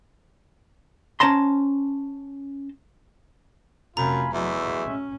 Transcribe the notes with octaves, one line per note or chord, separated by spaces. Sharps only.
C#4 C5 A5 A#5 C6
F1 F#2 C3 F4 G#5 A#5 B5
E2 F#3 G#3 A3 E5
C#4